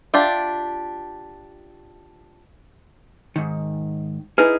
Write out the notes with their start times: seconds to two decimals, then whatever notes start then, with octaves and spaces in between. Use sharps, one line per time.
0.14 D4 F4 G4 E5
3.36 G#2 D#3
4.38 D#4 E4 G#4 B4